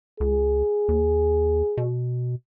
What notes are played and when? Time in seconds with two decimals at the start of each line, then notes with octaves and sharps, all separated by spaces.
0.20 C#2 G#4
0.88 D#2
1.77 B2